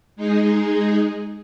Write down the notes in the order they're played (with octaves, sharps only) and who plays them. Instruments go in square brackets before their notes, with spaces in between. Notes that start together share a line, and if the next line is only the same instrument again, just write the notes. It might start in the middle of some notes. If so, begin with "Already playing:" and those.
[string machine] G#3 D#4 G#4